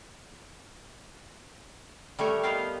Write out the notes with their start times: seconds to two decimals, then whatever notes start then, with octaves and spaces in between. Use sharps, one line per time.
2.19 G3 A3 A#4 C#5
2.43 G3 B3 D#4 A#4 C5 F5